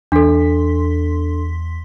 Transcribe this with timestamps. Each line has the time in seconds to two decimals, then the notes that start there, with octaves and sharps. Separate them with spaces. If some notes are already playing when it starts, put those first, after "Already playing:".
0.12 E2 D4 A4 C6 B6